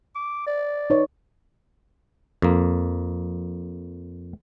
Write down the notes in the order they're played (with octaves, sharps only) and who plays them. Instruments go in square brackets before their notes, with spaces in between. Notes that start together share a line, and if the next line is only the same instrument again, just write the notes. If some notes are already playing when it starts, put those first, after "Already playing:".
[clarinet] D6
D5
[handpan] D#4 B4 C#5
[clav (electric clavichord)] F2 A#3